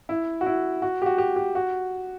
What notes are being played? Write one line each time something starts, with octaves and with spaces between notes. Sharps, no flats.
E4
F#4
E4
F#4
G4
F#4
G4
G4
F#4